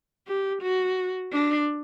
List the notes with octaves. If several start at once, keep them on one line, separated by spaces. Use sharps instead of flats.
G4
F#4
D4